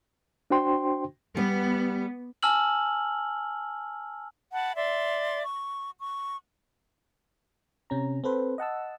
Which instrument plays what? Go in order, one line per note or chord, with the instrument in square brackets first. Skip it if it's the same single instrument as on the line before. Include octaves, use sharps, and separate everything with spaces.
[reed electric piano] D4 F#4 C5 G5 C6
[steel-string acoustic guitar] G3 [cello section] B3
[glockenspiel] G#5 A5 E6 F6 F#7
[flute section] F#5 A5 B5
D5 E5 C6
C#6
C#6
[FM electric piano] C3 C#4 A#5
C4 A4 B4 C5
D#5 F#5 A5 E6